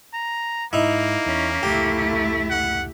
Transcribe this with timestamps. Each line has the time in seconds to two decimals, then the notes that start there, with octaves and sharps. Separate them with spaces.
0.14 A#5
0.73 G#2 A#3 D#4 E4
1.26 E2 C#4
1.63 F1 C#2 A3 E4 G4
2.50 F#5